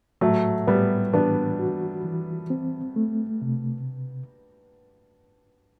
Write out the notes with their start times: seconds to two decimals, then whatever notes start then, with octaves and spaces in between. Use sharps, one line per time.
0.21 A2 F#3 A3
0.67 A2 G3 B3
1.13 E3 B3 D4
1.59 F#4
2.05 E3
2.50 C4
2.96 A3
3.42 C3